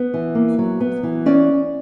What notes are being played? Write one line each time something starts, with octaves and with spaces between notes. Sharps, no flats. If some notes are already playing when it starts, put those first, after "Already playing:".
Already playing: B3
E3
A#3
F#3
B3
E3
C#4 D5